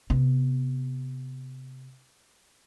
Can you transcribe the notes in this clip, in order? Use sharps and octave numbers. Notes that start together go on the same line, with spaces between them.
C3 B3